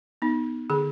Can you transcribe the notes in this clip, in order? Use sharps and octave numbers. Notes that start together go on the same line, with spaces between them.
B3 D#4
D3 G#4